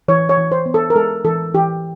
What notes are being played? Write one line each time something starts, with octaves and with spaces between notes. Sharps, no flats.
E3 C#5
C#5
E3
C5
B3
A4
A#4
G#3 A4
E3 A4
E3 G4